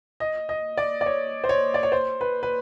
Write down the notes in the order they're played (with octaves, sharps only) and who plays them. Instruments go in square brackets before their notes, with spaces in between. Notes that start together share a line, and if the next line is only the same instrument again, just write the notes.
[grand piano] D#5
D#5
D5
D5
C#5
C5
C#5
D5
C#5
C5
B4
B4